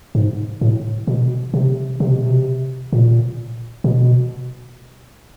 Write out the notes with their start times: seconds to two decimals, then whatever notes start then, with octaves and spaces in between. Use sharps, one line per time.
0.15 G#2
0.61 A2
1.07 B2
1.54 C3
2.00 C3
2.13 B2
2.25 C3
2.93 A#2
3.84 B2